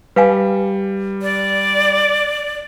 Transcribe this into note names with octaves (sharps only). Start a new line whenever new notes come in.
G3 B4 F5 G#5
D5